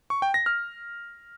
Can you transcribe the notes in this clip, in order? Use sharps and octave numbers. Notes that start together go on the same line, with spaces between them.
C#6
G5
A#6
F6